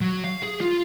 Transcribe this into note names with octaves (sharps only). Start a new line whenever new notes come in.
F#3
F5
G#4
F4